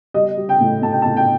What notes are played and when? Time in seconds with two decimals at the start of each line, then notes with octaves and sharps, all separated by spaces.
0.14 G3 D#5
0.37 G3
0.49 G5
0.61 A2
0.82 A2 A5
0.92 G5
1.02 A2 A5
1.17 G5